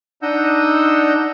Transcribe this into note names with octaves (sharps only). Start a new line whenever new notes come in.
D4 D#4 D#5 F#5 E6 G6